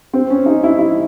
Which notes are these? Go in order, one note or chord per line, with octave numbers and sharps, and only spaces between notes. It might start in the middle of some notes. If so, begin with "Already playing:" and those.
C4
C#4
D#4
E4
E4